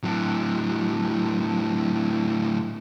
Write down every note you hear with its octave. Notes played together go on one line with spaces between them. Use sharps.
A2 F#3